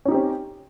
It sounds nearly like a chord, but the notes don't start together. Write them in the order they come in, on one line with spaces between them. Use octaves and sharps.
C#4 D#4 G4 C4